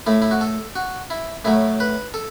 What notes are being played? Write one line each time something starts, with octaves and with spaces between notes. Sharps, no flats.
A2 A3 E4
E4
F#4
A4
F#4
E4
A2 F#3 A3 E4
B4
A4